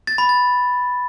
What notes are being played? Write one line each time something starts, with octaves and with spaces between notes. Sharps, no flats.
A6
B5
A6